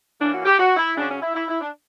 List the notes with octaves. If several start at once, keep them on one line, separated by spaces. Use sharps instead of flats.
E3 A#3 C#4 D4
F#4
G4
F#4
E4
C#3 F#3 C#4 D4
C#4
E4
E4
E4
D4